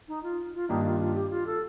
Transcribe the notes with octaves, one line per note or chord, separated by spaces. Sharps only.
D#4
F4
F4
G2 D#3 A#3 D4 D#4 G4
F4
F4
G4
F4
A4